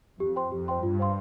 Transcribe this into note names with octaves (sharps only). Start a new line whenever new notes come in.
F2 G4
C5 G5 C6
F2 G4
C5 G5 C6
G2 F4
C5 F5 C6